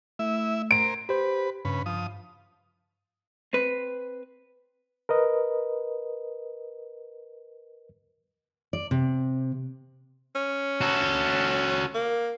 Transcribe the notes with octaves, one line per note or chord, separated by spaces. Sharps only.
A3 E4 E5
A#4 C5 D7
G4 B4 C5
G2 C#3 B4
F3 D#6
C4 B4
A#4 B4 D#5
D5
C3
C#4
F#4 A4
A#3